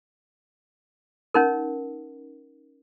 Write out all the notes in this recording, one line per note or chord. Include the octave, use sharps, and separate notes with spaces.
C#4 D#4 A#4